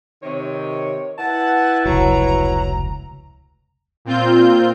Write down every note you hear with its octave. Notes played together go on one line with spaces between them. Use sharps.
C3 D#3 C#5
E4 B4 F#5 A5
F1 C#2 F#3 A#5
A#2 C4 F4 G6